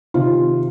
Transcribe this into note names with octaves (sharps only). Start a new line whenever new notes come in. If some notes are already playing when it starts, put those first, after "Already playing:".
C3 D#3 F4